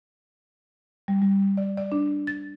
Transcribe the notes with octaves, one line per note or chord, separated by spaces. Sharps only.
G3
G3
D5
D5
D4
A6